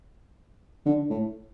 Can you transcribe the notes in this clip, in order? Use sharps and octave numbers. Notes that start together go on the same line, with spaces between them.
D3
A2